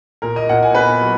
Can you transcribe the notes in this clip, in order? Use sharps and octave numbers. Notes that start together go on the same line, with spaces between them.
A#2 A#4
D#5
A#2 F#5
G#5
B3 B4
F#3